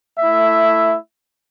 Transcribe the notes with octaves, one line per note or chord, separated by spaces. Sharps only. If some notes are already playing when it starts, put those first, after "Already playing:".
A3 E4 E5